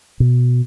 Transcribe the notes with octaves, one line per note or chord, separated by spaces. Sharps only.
B2